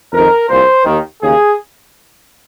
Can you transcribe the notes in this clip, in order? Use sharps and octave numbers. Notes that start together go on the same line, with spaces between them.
F2 D#3 A#4
C2 A#2 C5
D#2 D#3
D#2 C#3 G#4